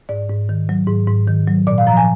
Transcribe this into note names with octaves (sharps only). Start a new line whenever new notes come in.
G#2 D5
G#2
D#3
F#3
G#2
G#2
D#3
F#3
A#2 D5
F5
F3 A#5
G#5